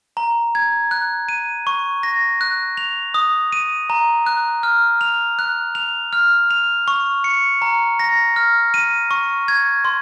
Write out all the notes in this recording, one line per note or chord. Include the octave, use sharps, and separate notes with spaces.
A#5
G#6
F#6
D#7
C#6
A#6
F#6
F7
D#6
D#7
A#5
F#6
F6
F7
F#6
F7
F6
F7
C#6
C#7
A#5
A#6
F6
D#7
C#6
G#6
C6